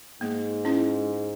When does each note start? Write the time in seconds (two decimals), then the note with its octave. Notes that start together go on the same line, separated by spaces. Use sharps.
0.21 G#2 A#3
0.65 C#4 E4